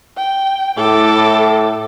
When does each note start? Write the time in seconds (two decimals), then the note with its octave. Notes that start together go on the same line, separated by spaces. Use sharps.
0.17 G5
0.77 A2 A4 D6